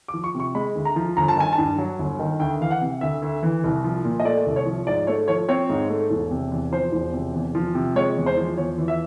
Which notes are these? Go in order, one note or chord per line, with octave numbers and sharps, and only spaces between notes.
D6
F3
C#6
C3
C#6
G#3 B5
D2
A#5
F3
G1 A#5
A5
D#3 G#5
A5
G2
F#3
G1
D#3
D2 G5
E3 F5
F#5
C3
D2 E5
D2
E3
C2
F3
A#2
D#5
A3 D5
C2
C#5
F3
G#2 D5
A3 C#5
F3 C#5
C4 C#5
G#2
A3
E1
C3
E2
F3 C5
E1
C3
E2
F3
C3
G#3 C#5
E2
C5
F3
E2 C#5
E3
E5